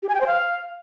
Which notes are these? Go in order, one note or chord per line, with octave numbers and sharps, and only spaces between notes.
G4
G#5
G5
C5
F5